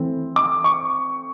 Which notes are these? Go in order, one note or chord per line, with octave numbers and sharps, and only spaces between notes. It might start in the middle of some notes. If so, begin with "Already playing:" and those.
Already playing: E3 A3 C4
D6
C#6